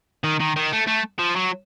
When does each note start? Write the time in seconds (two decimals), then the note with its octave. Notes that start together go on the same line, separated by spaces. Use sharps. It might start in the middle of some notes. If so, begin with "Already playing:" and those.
0.24 D#3
0.40 D#3
0.56 D#3
0.73 A3
0.87 A3
1.19 F3
1.36 F#3